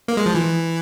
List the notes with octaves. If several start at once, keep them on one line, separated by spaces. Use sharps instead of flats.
A#3
G#3
F3
E3